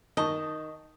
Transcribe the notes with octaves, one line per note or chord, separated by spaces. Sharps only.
D#3 D#5 A5 C#6